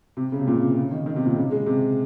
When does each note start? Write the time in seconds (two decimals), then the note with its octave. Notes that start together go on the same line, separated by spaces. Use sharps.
0.17 C3
0.32 C#3
0.40 C3
0.47 A#2
0.55 C3
0.77 C#3
0.91 D#3
1.06 D#3
1.16 C3
1.26 A#2
1.36 C#3
1.51 G#3
1.66 C3